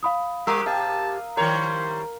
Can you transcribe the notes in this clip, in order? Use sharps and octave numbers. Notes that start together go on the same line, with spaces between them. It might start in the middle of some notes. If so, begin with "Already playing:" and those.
F5 B5 D#6
G3 G4 A#4 D#6 E6
C3 G4 F5 A5
D#3 G3 A#4 C5 C#5